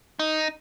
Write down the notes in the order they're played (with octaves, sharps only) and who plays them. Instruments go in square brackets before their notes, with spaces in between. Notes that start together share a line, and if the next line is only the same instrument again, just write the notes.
[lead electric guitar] D#4